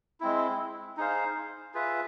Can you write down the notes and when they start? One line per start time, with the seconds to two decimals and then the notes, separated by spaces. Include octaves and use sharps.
0.20 G#3 C4 E4
0.97 D#4 G#4 C5 F5
1.74 F4 G#4 B4 E5